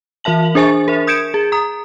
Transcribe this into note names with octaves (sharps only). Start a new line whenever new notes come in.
E3 A#4 E5 A5 F#7
D4 G#4 C5 G#5 C#6 A6
A#4 E5
D#6 G6 G#6 C#7 D7 E7
G#4
A#5 D#6